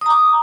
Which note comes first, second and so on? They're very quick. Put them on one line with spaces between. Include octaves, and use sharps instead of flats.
D#6 A#5 D6